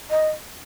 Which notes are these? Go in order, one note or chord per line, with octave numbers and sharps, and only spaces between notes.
D#5